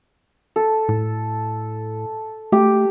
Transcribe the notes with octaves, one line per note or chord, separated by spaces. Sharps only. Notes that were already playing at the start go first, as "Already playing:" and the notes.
A4
A2
A3 G4